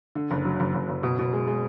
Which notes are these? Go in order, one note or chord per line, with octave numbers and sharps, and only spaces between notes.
D3
F#1
F#3
F#1
F#1
F#1
B2
B2
G#3
G#3